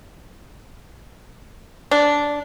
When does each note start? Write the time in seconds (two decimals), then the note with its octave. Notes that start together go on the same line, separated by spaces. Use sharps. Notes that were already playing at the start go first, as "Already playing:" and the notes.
1.91 D4